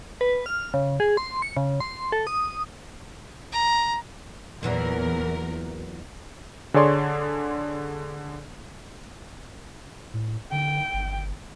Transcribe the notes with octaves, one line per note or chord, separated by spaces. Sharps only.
B4
F6
C#3
G#4
C6
C#7
C#3
C6
A4
D#6
A#5
E2 A#2 E3 F#3 A#4
D3 G#4 C#5 D5 C6
A2
D3 G5
G1